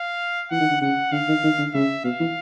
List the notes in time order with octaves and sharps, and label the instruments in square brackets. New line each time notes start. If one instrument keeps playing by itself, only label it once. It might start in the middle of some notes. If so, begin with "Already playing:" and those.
Already playing: [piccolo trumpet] F5
[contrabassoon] E3 [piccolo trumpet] F#5
[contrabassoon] D#3
D3
[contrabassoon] C#3 [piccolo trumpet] F#5
[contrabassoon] D3 [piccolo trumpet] F5
[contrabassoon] D#3
D#3
D3
[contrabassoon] C#3 [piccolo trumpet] E5
[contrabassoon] B2 [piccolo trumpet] F5
[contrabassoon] E3